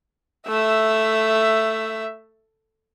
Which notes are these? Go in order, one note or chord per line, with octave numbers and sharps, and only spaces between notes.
A3 E5